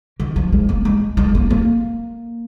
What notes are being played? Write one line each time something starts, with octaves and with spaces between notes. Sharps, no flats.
D#3
F3
G#3
A#3
G#3
G#3
A#3
A#3